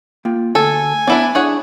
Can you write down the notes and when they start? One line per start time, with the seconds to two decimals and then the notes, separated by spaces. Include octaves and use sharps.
0.25 A#3 F4 G5
0.55 D2 A4 G#5
1.07 B3 D4 E4 D5 F#5 B5
1.35 D4 E4 G#4 C#5 F#5